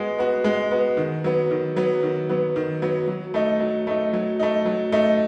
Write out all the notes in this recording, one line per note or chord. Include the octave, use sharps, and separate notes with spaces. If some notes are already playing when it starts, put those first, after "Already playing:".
Already playing: G#3 B3 F#4
B3 F#4
G#3
B3 F#4
D#3
F#3 B3
D#3
F#3 B3
D#3
F#3 B3
D#3
F#3 B3
F#3
A3 D#4
F#3
A3 D#4
F#3
A3 D#4
F#3
A3 D#4